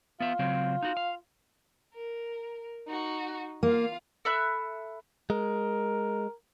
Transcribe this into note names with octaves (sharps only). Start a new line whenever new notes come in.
B3 F4 E5
C#3 F#3 C4
D#4 F#4
F5
A#4
D#4 F#4
A#3 F4 F5
A4 E5 B5 F#6
G#3 A#4